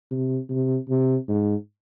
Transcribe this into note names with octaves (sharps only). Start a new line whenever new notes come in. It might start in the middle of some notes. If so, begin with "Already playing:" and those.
C3
C3
C3
G#2